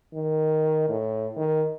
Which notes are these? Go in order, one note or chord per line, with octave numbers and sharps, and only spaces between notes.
D#3
A2
D#3